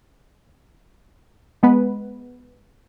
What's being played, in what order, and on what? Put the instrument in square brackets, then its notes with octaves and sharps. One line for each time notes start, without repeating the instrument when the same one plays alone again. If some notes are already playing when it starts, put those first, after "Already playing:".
[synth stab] G#3 B3 B4